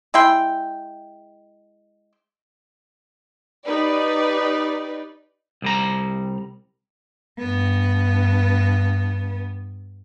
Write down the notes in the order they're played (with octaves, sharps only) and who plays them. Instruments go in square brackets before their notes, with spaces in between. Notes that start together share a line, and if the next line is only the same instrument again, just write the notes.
[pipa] G#3 E4 G5 C6
[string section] D#4 G4 B4 D5
[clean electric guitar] C2 G3 A#5
[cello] G2 B3